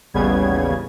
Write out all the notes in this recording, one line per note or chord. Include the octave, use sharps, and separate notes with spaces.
A1 D#2 C#3 G3 B3 G#6